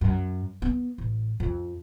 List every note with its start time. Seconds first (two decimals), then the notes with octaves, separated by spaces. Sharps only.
0.01 F#2
0.62 B3
0.98 A1
1.40 F2